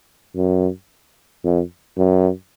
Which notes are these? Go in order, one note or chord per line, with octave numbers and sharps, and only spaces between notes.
F#2
F2
F#2